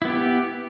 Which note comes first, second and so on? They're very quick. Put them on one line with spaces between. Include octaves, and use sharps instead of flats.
E4 B3 G4